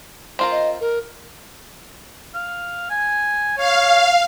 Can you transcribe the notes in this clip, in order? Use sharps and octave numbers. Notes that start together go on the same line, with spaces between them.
C4 F4 A#4
D#5
A#4
F5
G#5
C#5 F5